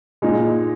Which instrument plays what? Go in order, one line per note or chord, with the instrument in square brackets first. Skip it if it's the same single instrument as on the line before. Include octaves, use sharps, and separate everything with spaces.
[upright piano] A#2 G#3 D#4 G#4